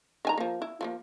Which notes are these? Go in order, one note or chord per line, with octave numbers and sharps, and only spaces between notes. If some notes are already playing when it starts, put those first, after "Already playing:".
D#3 G#5 A#5
F3 A#3
E4
F3 A3 A#3